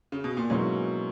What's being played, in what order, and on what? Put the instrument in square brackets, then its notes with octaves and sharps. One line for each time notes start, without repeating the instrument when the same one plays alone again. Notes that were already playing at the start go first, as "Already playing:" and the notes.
[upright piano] C#3
B2
A#2
[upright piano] G#2 [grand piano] B2 F#3 A#3 C#4 E4